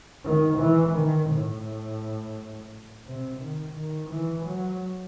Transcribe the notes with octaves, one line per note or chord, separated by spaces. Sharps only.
D#3
E3
D#3
A2
C3
D#3
D#3
E3
F#3